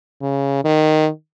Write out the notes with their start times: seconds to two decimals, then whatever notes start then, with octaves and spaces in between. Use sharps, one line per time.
0.22 C#3
0.64 D#3